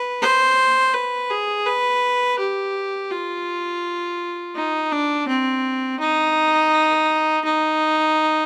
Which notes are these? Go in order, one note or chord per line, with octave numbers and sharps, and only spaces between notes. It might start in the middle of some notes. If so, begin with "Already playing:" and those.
Already playing: B4
C5
B4
G#4
B4
G4
F4
D#4
D4
C4
D#4
D#4